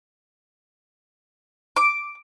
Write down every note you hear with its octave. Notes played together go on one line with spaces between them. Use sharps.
D6